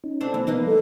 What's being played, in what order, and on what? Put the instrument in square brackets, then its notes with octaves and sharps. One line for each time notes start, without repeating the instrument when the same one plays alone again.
[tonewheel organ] C#4 D#4
[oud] C4 D4 A4
[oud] E3 [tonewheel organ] A3 B3
[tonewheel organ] E3 B3 D#4 [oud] A#3 B4 D#5
[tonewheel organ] G3 [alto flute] A4